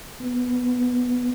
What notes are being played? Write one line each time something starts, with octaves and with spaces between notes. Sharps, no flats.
B3